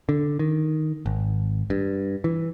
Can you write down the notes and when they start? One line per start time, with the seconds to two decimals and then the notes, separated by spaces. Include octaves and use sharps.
0.09 D3
0.39 D#3
1.06 G#1
1.70 G2
2.24 E3